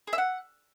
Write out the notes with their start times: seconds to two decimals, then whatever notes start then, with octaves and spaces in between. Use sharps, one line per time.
0.07 G#4
0.13 E5
0.18 F#5